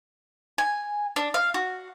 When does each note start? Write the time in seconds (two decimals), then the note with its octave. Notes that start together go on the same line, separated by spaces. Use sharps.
0.58 G#5
1.16 D4
1.34 F5
1.54 F#4